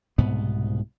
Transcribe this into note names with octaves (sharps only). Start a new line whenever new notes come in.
C2 G#2 B2 B3